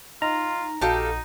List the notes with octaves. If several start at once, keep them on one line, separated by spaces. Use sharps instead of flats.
D#4 F4 A#5
A#1 D#4 F#4 G4 A4 F5